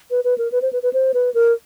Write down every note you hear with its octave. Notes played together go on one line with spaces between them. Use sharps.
B4
B4
A#4
B4
C5
B4
B4
C5
B4
A#4